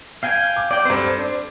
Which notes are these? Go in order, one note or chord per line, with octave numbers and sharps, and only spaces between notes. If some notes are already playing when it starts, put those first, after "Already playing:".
F5 G5 G#5
D6
D5 G5
G2 C4 A4 C5
D4